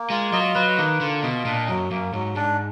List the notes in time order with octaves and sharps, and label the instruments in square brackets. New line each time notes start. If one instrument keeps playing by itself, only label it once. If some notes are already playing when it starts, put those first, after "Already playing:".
Already playing: [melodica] A#3
[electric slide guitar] G#3 [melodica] F4
[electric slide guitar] F#3 [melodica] D#5
[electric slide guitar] F#3 [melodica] B4
[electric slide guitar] D#3 [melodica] A#3
[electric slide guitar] D3 [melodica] F4
[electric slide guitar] B2 [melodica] D#5
[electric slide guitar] A#2 [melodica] D4
[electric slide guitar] F#2 [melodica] F#3
[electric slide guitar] F#2 [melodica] A#3
[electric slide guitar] G#2 [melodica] F#3
[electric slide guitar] G#2 [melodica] D4